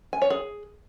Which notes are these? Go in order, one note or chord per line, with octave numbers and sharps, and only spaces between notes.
G#5
C#5
G#4